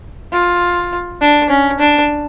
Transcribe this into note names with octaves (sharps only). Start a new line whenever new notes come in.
F4
D4
C#4
D4